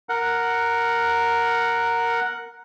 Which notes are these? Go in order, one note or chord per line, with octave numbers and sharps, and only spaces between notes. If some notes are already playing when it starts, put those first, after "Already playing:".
A#4 F#5